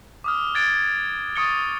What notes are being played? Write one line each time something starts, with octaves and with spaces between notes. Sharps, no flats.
D6 D#6 F6
F#6 G#6 A6 D7
C#6 D#6 A6 C#7 D7 G7